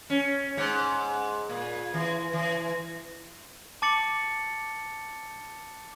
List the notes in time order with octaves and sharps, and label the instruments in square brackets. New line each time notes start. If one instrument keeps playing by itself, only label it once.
[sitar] C#4
G#2
A#2
E3
E3
[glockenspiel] A5 D6 A6 C#7 F#7